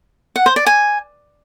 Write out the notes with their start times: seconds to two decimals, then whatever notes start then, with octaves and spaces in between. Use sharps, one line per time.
0.36 F#5
0.46 C5
0.56 D5
0.66 G#5